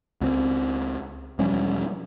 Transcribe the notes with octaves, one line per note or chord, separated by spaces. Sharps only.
C#2 C4
E1 F3 G3 C#4